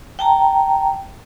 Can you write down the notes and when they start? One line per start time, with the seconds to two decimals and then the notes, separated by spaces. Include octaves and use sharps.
0.19 G5 A5 A#5